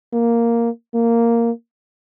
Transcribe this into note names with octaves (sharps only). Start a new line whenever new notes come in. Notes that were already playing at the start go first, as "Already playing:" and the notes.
A#3
A#3